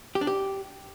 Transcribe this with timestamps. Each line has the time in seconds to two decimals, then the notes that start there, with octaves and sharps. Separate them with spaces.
0.15 G4
0.21 D4
0.27 G4